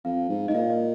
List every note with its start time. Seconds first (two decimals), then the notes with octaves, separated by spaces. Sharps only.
0.05 F2 F5
0.30 G#2
0.48 G#2 D#5
0.54 A#2 F5
0.70 D#5